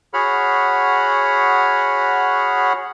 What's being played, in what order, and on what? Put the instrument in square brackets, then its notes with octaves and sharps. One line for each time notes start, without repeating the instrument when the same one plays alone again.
[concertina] F#4 G#4 C#5 F#5 B5 F6